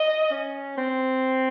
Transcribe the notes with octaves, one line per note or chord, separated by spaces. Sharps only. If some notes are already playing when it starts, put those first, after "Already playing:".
Already playing: D#5
C#4
C4